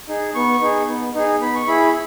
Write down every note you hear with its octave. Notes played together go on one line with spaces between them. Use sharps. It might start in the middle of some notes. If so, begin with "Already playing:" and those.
D#4 G#4
B3 C#6
D#4 G#4
B3
D#4 G#4
B3 B5
C#6
E4 G#4 B5